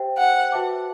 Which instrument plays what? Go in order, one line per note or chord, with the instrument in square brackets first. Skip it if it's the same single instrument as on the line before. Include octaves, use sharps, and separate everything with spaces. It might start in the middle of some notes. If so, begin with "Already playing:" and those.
Already playing: [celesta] G4 C5 E5 G5
[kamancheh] F#5
[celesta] F#4 B4 E5 A5 D6